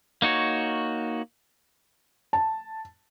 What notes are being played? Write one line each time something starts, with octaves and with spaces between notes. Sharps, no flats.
A#3 D#4 F#4 C#5
A5